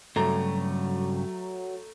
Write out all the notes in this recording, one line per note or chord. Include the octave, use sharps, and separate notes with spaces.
G2 C#3 F#3 A3 A#5